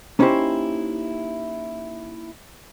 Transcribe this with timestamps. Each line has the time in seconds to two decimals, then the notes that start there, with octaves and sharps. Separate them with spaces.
0.19 A#3 C#4 D#4 E4 G4 C5